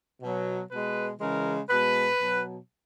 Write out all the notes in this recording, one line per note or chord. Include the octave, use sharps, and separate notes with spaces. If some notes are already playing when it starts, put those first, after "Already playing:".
B2 F#3
B2 G#3 B4
C#3 E3 G#3 A#4
B2 G#3 B4
B2 F#3